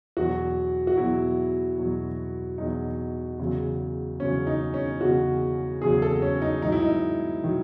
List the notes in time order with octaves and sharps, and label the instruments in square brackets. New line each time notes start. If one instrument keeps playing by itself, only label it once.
[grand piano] E2 B2 F#3 F#4
F#4
E2 B2 F#3 E4
E2 B2 F#3
E2 B2 F#3 D#4
E2 C#3 F#3
E2 C#3 F#3 C#4
D#4
C#4
E2 C#3 F#3 F#4
E2 C#3 F#3 G#4
A4
C#4
D#4
G#2 D#3 F#3 D#4
E4
D#4
D#3 F#3